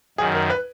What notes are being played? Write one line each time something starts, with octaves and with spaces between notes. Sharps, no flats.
F#2 D#3 F#3 G#4
A#4
B4